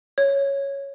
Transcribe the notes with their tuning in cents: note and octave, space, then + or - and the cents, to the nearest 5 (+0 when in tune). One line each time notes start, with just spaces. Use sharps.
C#5 +0